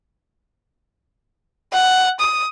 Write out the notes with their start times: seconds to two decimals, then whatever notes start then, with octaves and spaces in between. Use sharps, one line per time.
1.73 F#5
2.20 D#6